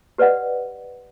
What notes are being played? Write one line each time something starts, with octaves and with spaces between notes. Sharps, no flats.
G4 B4 D5 D#5 F#5